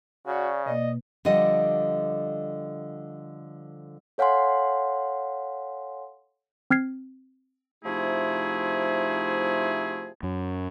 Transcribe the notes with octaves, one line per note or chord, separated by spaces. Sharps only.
C#3 F#4 D5
B2 A#3 D5 D#5
D3 F3 G3 D#5 F#5
A4 C#5 F5 F#5 G#5 C6
C4 F6 G#6 C7
C3 F3 A3 D#4 E4 G#4
F#2